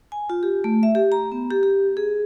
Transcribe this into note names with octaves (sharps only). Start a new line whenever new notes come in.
G#5
F4
G4
A3
E5
G4
A#5
B3
G4
G4
G#4